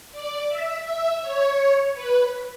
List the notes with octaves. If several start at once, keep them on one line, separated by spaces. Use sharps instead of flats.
D5
E5
E5
C#5
B4